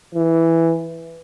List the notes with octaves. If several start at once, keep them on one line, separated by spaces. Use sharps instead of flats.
E3